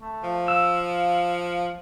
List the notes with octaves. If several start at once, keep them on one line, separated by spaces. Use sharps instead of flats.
A3
F3
F5 E6